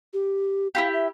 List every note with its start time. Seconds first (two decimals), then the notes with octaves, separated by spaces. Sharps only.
0.13 G4
0.75 E4 F4 G4 F5
0.93 E5